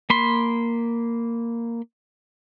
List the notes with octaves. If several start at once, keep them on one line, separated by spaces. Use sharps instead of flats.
A#3 B5 C6